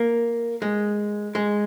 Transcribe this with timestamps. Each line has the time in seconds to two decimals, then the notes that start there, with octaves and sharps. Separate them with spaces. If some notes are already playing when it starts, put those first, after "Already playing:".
Already playing: A#3
0.62 G#3
1.35 G#3